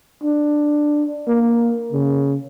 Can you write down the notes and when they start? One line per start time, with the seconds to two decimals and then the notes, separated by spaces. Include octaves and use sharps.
0.23 D4
1.28 A#3
1.92 C#3